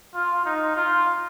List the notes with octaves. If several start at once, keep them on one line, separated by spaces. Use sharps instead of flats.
F4
D#4
F4